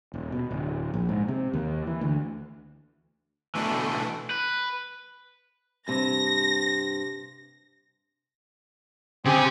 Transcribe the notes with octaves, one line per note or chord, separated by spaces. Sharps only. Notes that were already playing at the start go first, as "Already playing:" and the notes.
D#1
B2
D1
A#1
G#2
C3
D#2
E3
D2
B2 E3 A3 D4
B4
G2 C3 A#6
C#3 C4 G4 G#5